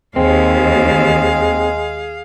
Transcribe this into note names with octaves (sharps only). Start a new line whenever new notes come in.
D#2 G#3 C4 G#4 F5